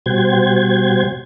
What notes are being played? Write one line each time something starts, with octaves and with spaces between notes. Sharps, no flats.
B2 G3 F#4 C5 G5 G#6